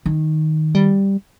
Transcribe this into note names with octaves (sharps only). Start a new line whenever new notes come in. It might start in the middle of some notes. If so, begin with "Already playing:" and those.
D#3
G3